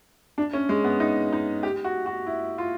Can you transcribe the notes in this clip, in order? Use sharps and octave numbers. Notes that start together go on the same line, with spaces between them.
D4
C#4
G#3
B3
D#4
D#4
G4
F#4
F#4
E4
F4